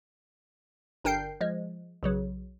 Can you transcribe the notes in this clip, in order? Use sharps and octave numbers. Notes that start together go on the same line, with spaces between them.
G1 D4 A#4 G5 G6 C7
F3 G#3
B1 C#3 F#3